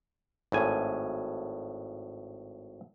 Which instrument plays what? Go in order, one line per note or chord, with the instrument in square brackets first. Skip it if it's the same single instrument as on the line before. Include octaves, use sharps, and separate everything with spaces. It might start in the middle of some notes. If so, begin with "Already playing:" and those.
[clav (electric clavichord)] G#1 A2 G#5